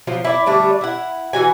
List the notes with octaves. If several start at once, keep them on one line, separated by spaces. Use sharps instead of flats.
F3 F#3 F4
E4 D5
D3 G3 A3 D4
E4 F#5
E3 C#4 F#4 G#5